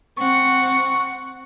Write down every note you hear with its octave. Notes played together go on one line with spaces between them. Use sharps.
C4 F#5 C#6